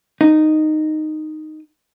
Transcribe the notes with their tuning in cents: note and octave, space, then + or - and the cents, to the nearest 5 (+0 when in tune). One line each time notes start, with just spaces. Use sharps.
D#4 -10